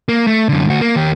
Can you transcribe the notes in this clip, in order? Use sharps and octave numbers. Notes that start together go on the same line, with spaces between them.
A#3
A3
F#2 D3
D2 F#4
A#3
D#2 G4